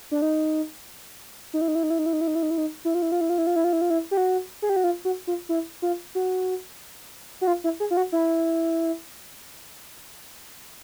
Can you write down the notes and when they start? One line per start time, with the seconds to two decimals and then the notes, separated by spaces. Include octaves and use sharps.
0.11 D4
0.22 D#4
1.54 D#4
1.61 E4
1.68 D#4
1.75 E4
1.83 D#4
1.90 E4
1.99 D#4
2.06 E4
2.13 D#4
2.21 E4
2.27 D#4
2.35 E4
2.43 D#4
2.50 E4
2.58 D#4
2.85 E4
2.94 F4
3.02 E4
3.12 F4
3.21 E4
3.30 F4
3.38 E4
3.47 F4
3.56 E4
3.64 F4
3.73 E4
3.81 F4
3.90 E4
4.11 G4
4.17 F#4
4.62 G#4
4.69 G4
4.76 F#4
4.84 F4
5.05 F#4
5.27 F4
5.49 E4
5.82 F4
6.15 F#4
7.41 F#4
7.47 F4
7.64 E4
7.80 G#4
7.91 F4
7.97 F#4
8.12 E4